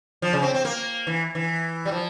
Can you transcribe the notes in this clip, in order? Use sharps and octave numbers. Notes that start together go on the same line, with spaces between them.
F3
C#3
C4
C4
A#3
E3
E3
G3
F3